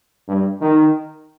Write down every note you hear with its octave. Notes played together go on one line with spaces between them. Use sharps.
G2
D#3